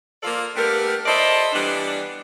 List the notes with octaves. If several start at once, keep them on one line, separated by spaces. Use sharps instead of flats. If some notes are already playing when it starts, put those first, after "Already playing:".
F3 A#3 F4 A4 D5
G3 A3 B3 D4 G4 A#4
E4 A4 C5 D5 D#5
E3 G3 B3 D4